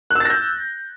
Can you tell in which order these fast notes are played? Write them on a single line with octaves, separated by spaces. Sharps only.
F#6 E6 A6 A#6 G6